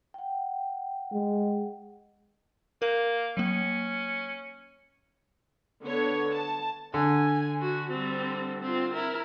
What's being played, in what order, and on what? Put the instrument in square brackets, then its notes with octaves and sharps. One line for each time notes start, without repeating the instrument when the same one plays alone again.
[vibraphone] F#5 G5
[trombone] G#3
[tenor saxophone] A#3 [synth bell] A#4
[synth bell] F#3 A#3 [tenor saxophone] C#4
[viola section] D3 B3 C#5
A5
[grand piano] D3 [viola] G#5
[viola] F#4
G3 C4
C4 F4
E4 A#4